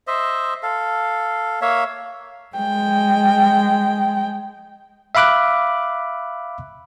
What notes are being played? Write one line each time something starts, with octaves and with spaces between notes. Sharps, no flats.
C5 D#5 E5
A4 F5
A#3 C#5 E5 F5
G#3 G5
E5 F5 B5 D6 F#6